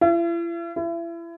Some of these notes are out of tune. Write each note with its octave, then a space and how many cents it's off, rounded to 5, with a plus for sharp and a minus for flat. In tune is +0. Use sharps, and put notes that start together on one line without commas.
E4 +45
E4 +35